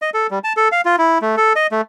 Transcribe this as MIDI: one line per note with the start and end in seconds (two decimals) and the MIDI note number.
0.02 0.10 75
0.14 0.27 69
0.31 0.39 55
0.44 0.53 81
0.57 0.68 69
0.72 0.81 77
0.85 0.96 65
0.98 1.18 64
1.22 1.36 57
1.37 1.53 69
1.56 1.67 75
1.71 1.81 57